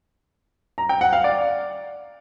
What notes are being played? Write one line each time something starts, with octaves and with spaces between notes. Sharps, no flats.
A#5
G5
F#5
F5
D5